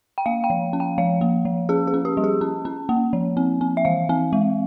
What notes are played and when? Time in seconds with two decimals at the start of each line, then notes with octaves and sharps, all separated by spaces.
0.18 G5
0.26 A#3 F5
0.44 G5
0.50 F3
0.73 C#4
0.80 G5
0.98 F3 F5
1.21 A#3
1.45 F3
1.69 C#4 G#4
1.87 G#4
1.94 C#4
2.05 G4
2.17 G3
2.24 G#4
2.41 C#4
2.65 C#4
2.89 A#3
3.13 F3
3.37 C4
3.61 C4
3.77 E5
3.85 E3 F5
4.09 C4
4.33 G#3